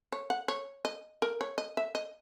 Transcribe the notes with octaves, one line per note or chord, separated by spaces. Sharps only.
C#5
F#5
C#5
D#5
A#4
C#5
D#5
E5
D#5